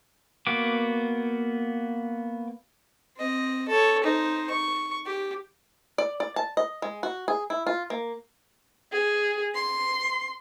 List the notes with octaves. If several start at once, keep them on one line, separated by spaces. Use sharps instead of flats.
A#3 B3 F#4 D6
C4 D#5
A4 C#5
D#4 C5
C#6
G4
D5
D5
A5
D#5
G#3
F#4
G#4
E4
F4
A#3
G#4
C6